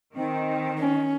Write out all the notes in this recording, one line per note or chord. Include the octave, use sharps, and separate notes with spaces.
D#3 C4
C#4